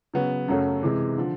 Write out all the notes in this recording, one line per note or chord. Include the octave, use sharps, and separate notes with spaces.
C#3 F#3 B3
F#2 C#3 F#3 A3 C#4
C3 E3 G#3
D3 F3